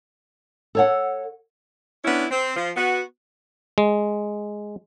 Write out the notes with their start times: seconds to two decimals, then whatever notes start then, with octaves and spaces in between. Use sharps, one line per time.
0.75 A4 C#5 F#5
2.05 B3 C#4 D4 E4
2.31 C4
2.56 F3
2.76 B3 F#4
3.78 G#3